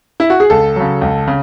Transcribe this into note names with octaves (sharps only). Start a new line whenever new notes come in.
E4
F#4
G#4
C#2 A4
C#3 F#3
C#2
C#3